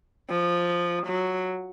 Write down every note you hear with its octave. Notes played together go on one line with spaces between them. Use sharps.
F3
F#3